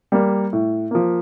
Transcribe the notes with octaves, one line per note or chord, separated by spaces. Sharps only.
G3 A#3
A2
F3 A#3